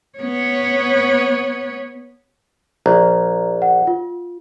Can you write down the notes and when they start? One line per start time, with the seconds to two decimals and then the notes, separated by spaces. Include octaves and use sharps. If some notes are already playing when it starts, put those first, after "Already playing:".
0.19 B3 C#5
2.86 A#1 A#5
3.62 F#5
3.87 F4